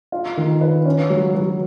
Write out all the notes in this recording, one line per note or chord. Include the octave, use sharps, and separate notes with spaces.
F4
D#3
B4
C#4
F#3
F#3